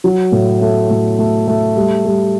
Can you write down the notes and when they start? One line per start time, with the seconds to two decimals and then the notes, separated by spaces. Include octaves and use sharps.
0.04 F#3
0.32 A2
0.62 A3
0.90 A2
1.19 A3
1.48 A3
1.76 G3
2.05 G3